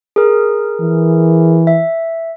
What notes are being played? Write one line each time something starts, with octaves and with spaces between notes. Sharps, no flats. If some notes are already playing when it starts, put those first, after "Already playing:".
G#4 A#4
E3
E5